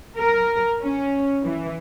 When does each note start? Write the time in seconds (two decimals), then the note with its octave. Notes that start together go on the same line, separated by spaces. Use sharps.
0.19 A#4
0.82 C#4
1.44 E3